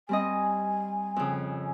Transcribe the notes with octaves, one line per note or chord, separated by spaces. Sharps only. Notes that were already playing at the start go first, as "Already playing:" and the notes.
G3 C4 D#5 G#5
F2 C#3